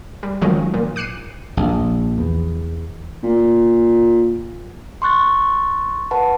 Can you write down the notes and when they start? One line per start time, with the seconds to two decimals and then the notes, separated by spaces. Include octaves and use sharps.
0.23 G3
0.42 D#3 F3 F#3 G#3 C#4
0.74 A#2
0.96 D6 F#6 C7 C#7 D#7
1.57 A#1
2.18 E2
3.23 A#2
5.02 C6 C#6 F#6 A6
6.11 B4 F#5 A5 B5